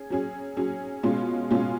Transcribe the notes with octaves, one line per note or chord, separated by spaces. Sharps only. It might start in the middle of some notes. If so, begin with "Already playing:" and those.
Already playing: C#4 G#4
F#3 C#4 G#4
F#3 C#4 G#4
B2 G#3 C#4 F4
B2 G#3 C#4 F4